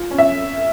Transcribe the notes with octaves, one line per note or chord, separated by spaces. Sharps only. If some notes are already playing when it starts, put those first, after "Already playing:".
Already playing: F4
C#4
E5